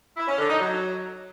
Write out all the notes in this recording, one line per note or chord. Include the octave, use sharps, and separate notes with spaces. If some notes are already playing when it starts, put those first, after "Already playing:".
E4
C#4
D3
D#4
F#3